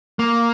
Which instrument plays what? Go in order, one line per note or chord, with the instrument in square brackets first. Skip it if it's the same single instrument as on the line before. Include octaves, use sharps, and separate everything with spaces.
[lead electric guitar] A#3